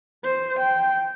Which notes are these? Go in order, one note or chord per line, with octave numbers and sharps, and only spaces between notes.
C5
G5